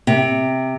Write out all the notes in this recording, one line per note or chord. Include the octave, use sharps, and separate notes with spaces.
C3